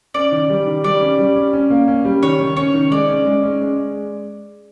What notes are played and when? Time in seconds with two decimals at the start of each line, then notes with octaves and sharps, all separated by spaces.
0.14 C#4 D5
0.32 D#3
0.49 G3
0.67 D#3
0.84 G3 D5
1.01 C#4
1.19 G3
1.36 C#4
1.53 C#4
1.70 A#3
1.88 C#4
2.05 G3
2.23 D#3 C#5
2.40 D#3
2.57 C#4 C#5
2.74 D#3
2.91 G#3 D5
3.08 C#4
3.26 G#3
3.44 C#4
3.61 G#3